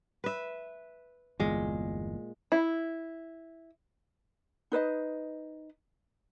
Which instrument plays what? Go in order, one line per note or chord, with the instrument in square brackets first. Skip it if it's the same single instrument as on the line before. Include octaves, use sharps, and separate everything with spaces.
[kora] B4 E5
[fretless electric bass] G1 E2 [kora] A#2 G#3
[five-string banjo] E4
[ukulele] D#4 B4 C5 D#5